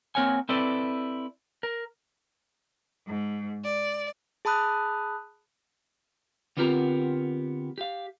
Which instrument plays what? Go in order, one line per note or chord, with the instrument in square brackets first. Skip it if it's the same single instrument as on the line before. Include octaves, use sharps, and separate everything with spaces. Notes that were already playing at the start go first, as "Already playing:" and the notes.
[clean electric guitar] A#3 C4 A#4 C#5 F#5 G#5
C4 E4 A4 B4 D5
A#4
[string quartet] G#2
D5
[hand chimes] G#4 A5 B5 D#6 F#6
[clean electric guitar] D3 B3 C4 F4 G4 A#4
G4 F5